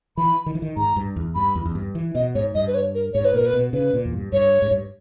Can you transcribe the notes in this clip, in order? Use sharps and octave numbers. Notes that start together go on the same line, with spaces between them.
E3 B5
D#3
E3
D#3
G#2 A#5
G2
E2
G2 B5
E2
E2
G2
E3
B2 D#5
G#2 C#5
G2 D#5
B4
C#5
A#4
G#2 C#5
B4
A#2 A#4
B4
B2
C#3 B4
A#2
E2
G2
G2 C#5
G#2
G2